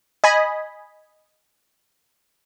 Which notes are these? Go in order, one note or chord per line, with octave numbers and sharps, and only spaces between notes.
D#5 G#5 B5